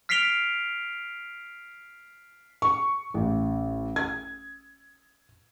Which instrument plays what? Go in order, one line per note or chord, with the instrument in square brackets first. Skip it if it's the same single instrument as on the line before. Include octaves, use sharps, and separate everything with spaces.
[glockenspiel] F6 B6 C7 D7 F7 G7
[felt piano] C#6
A1
G#6